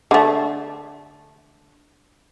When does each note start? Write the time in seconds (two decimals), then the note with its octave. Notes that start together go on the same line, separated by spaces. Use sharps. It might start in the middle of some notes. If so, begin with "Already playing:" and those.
0.11 D3 A3